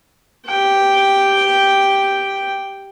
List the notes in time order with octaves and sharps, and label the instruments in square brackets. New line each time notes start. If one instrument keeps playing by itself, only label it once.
[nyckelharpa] G4 G5